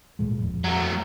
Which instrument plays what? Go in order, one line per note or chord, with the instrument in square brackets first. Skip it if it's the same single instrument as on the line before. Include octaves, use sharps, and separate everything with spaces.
[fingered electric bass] D1 A#2 G#3
F2
[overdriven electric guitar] F#3 A3